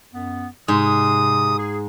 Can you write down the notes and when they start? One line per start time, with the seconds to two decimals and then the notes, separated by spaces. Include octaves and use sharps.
0.13 F#2 B3
0.68 G#2 C3 D#6
1.57 G#4